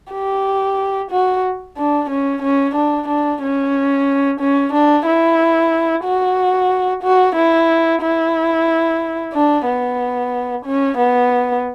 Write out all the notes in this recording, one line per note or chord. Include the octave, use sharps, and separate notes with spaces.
G4
F#4
D4
C#4
C#4
D4
D4
C#4
C#4
D4
E4
F#4
F#4
E4
E4
D4
B3
C#4
B3